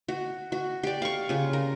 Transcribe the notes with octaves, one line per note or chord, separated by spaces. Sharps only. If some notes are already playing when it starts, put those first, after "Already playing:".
F#4
F#4
G4 D5
F5 C#6
C#3 F4
A#4